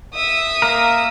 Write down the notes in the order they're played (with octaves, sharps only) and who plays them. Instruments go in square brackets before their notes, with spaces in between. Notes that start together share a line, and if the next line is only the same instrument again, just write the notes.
[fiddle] E5 D#6
[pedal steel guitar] A#3 A#4